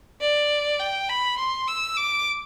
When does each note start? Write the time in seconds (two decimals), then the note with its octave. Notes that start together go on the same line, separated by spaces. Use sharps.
0.21 D5
0.80 G5
1.09 B5
1.38 C6
1.68 E6
1.97 D6